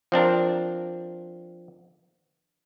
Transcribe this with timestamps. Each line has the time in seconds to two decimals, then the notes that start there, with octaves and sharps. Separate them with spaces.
0.12 F3 C4 D4 A#4